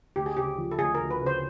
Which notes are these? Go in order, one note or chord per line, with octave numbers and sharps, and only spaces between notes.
D2 G4
G#4
C#3 G4
F3
A4
D2 G#4
A#4
D2
B4
C#3
C5